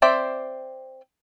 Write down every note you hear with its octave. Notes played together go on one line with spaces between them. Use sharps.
C4 C5 D5 E5